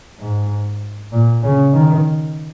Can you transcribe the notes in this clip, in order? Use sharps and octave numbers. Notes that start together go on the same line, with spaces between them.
G#2
A#2
C#3
D#3